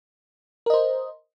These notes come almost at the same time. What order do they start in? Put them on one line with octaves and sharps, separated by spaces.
A#4 D#5 C5